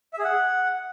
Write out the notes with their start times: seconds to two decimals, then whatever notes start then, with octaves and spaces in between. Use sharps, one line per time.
0.13 E5
0.19 G#4
0.24 F#5